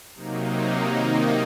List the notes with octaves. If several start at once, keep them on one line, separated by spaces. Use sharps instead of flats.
C3 F#3 A#3 D#4
C3 D#3 A#3 D#4